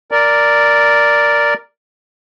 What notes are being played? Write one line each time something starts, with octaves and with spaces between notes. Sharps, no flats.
A#4 D5